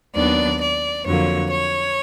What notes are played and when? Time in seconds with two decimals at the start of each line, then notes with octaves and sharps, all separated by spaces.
0.15 D#2 D#3 F#3 B3 D4 D5
0.60 D5
1.04 F2 D3 F#3 A#3 C#5
1.50 C#5